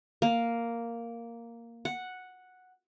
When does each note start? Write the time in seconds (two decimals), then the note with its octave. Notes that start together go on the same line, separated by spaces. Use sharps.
0.22 A#3
1.85 F#5